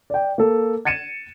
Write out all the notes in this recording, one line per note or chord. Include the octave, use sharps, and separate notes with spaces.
D5 G5
A#3 A4
G#6 A6 C#7 D#7 E7